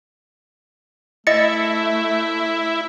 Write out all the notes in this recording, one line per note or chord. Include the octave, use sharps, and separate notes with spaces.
A3 E4 D#5 A6 C#7